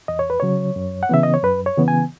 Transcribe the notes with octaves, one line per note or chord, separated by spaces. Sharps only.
E2 D#5
C#5
B4
C#3 F#3 C#5
F#2
F#5
C#3 E3 B3 E5
D#5
C#5
F#2 B4
C#5
C#3 E3 B3
G#5